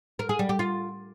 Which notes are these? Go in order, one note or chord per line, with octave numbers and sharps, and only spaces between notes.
A#4
G#4
G3
G4
F4